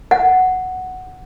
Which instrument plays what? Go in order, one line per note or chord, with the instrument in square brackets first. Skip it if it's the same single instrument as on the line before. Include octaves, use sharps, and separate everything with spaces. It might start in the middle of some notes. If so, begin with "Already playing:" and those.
[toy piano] F#5